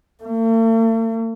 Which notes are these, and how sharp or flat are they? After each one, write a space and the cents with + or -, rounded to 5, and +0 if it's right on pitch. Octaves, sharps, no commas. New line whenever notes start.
A3 +45